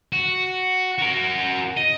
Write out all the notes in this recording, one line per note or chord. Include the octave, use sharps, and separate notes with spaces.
F#4
F#4 A#4
D#5